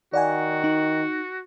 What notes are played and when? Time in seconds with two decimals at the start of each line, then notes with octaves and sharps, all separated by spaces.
0.13 D#3 F#4 D5 F#5 G#5
0.64 D#4